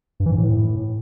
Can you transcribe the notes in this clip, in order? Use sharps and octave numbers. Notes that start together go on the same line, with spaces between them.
G2
E3
G#2
A2